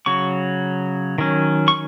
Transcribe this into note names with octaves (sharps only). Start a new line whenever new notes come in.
C#3 F#3 C#6
D#3 F#3 C#4
C#6